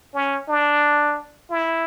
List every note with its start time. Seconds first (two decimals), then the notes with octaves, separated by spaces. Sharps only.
0.14 C#4
0.48 D4
1.51 E4